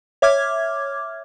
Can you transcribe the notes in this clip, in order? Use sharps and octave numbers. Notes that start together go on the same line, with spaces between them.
C#5 E5 D6 F6 G#6